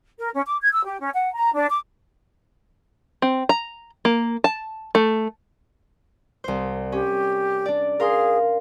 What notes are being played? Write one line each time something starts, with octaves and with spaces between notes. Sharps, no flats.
A#4
C#4
D6
G#6
E6
G4
C#4
F#5
A#5
D4
D6
C4
A#5
A#3
A5
A3
C2 C5
C#4 G4
D4 D5
G#4 A#4 F5 C6